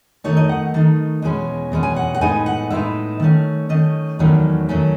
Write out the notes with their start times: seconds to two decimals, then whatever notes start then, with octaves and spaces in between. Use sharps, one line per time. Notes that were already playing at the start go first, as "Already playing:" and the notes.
0.24 D#3 A3 D#4 C#5
0.37 D#5
0.49 F#5
0.74 D#3 A3 D#4
1.22 E2 B2 G#3 C#4
1.72 E2 B2 G#3 C#4
1.83 G#5
1.96 F#5
2.15 F#5
2.21 A2 G#3 B3 D#4 G#5
2.46 F#5
2.70 A2 G#3 B3 D#4 E5
3.20 D#3 A3 C#4
3.69 D#3 A3 C#4 D#5
4.19 E2 D#3 F#3 A3 C#4
4.69 D#3 F#3 A3 C#4